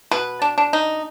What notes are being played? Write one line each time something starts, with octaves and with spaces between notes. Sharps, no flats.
B2 B4
D4
D4
D#4